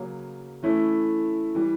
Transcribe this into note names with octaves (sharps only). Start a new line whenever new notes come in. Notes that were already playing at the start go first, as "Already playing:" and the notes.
Already playing: C#3 F#3 A#3
E3 A3 C#4 E4
E3 G3